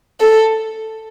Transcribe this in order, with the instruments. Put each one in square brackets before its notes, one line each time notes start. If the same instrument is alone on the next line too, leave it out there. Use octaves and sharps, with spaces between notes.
[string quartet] A4